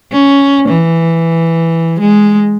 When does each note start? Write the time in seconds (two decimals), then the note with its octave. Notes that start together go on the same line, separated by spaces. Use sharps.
0.12 C#4
0.69 E3
2.00 G#3